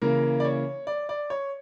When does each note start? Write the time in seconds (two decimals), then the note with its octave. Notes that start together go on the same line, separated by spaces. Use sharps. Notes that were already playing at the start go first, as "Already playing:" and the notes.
0.02 C#3 E3 A#3 A#4
0.40 D5
0.45 C#5
0.87 D5
1.09 D5
1.30 C#5